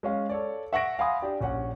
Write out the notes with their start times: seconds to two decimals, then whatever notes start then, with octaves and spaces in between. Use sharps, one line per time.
0.03 G#3 C#4 F5
0.29 A4 C#5 D5
0.73 E5 F#5 C#6 A#6 D7
0.99 F5 F#5 G#5 B5 C6 D#6
1.22 D4 G4 D5
1.41 A#1 C#4 F#5